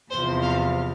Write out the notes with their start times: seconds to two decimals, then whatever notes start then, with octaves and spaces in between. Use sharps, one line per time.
0.10 E2 C3 F3 C5
0.42 F5